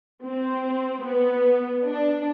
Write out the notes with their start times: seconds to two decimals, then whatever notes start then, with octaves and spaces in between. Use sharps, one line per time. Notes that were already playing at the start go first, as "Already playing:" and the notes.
0.24 C4
1.03 B3
1.85 D4